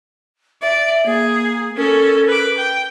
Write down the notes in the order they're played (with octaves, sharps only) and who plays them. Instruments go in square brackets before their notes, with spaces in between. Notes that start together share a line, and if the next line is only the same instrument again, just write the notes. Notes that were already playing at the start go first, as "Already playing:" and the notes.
[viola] D5 [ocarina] E5
[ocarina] A#3 [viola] G#4
[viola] C#4 A4 [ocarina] A#4
[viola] B4 D6
G5